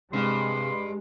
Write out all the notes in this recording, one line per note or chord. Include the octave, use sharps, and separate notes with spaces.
G2 C3 G#3 C6